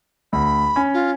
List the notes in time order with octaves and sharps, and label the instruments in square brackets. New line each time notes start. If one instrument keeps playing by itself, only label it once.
[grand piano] D2 [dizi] B5
[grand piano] C#4
[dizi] F4